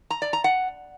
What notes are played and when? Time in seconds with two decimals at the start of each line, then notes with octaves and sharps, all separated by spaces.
0.10 A#5
0.22 D5
0.33 A#5
0.44 F#5